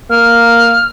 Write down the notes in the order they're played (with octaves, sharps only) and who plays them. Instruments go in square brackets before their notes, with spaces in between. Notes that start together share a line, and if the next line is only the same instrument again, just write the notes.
[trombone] A#3 [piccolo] F6